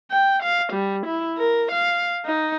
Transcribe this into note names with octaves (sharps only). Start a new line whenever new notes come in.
G5
F5
G3
E4
A#4
F5
D#4